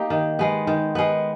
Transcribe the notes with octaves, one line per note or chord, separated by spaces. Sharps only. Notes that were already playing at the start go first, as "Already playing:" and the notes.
Already playing: A#3 D#4 G4
D#3
G#3 B3
D#3
G#3 B3